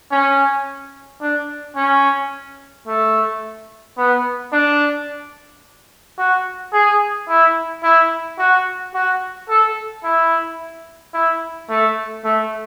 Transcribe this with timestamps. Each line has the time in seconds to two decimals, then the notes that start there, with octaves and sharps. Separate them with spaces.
0.12 C#4
1.22 D4
1.77 C#4
2.87 A3
3.97 B3
4.52 D4
6.18 F#4
6.73 G#4
7.29 E4
7.84 E4
8.39 F#4
8.94 F#4
9.49 A4
10.04 E4
11.14 E4
11.70 A3
12.25 A3